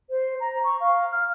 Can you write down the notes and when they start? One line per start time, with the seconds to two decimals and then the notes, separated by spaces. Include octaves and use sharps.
0.10 C5
0.40 A#5
0.64 C#6
0.80 F5
1.12 F6